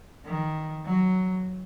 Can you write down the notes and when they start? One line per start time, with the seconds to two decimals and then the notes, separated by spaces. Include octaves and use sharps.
0.25 D#3
0.84 F#3